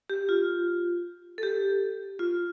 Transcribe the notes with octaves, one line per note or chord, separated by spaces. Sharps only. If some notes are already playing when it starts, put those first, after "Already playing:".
G4
F4
A4
G4
F4